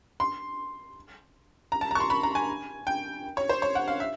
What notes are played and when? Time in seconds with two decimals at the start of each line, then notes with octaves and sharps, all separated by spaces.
0.20 C6
1.72 A#5
1.81 A5
1.91 A#5
1.95 C#6
2.00 C6
2.10 B5
2.23 A#5
2.35 G#5
2.87 G5
3.37 C#5
3.49 C5
3.62 C#5
3.75 F#5
3.88 F5
4.00 E5